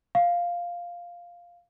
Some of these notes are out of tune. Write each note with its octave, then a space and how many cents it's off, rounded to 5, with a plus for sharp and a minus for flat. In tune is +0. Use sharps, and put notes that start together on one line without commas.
F5 +0